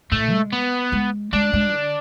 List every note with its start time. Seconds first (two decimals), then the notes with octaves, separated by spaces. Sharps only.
0.12 A2 A3
0.32 G#3
0.53 B3
0.92 G#3
1.33 G#3 D4
1.53 G#3
1.73 D3